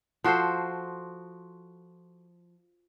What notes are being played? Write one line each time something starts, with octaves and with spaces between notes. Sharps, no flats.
F3 F#4 A4 C5